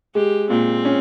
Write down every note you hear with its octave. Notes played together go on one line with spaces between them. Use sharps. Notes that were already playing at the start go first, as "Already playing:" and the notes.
G#3 G4
A#2 C4
C#4